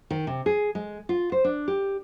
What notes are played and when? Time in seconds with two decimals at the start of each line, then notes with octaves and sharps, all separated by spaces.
0.10 D#3
0.27 C3
0.46 G#4
0.75 G#3
1.09 F4
1.32 C5
1.44 D4
1.68 G4